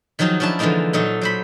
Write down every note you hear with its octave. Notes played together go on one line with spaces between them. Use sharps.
D#3 F3 F#3 D#4 G#4
F3 C#4 D4 E4 A5
D3 E3 F3 G#3 A#3 D#4
A#2 F#3 D#4 A4
F#3 C5 B5